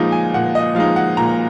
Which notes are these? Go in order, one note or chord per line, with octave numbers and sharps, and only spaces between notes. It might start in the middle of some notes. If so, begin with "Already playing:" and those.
Already playing: A#2 F3 G#3 D#4
G#5
A#2 F#5
D#5
F3 G#3 D#4 F5
F#5
A#2 A#5